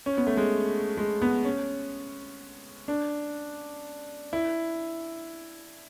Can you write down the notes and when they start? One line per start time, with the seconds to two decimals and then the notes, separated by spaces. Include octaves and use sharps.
0.06 C#4
0.17 B3
0.27 A3
0.37 G#3
0.98 G#3
1.22 B3
1.45 C#4
2.88 D4
4.33 E4